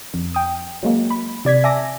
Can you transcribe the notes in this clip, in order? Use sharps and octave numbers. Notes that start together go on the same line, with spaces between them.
F2
G5 D#6
F#3 G#3 A#3
B5
C3 D5 G#6 B6
E5 G#5 A5 D6 A#6